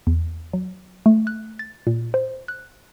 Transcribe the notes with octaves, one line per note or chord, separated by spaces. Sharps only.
E2
F#3
A3
F#6
A6
A#2
C5
F#6